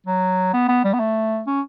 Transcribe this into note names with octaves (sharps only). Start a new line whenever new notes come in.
F#3
B3
B3
G3
B3
A3
C#4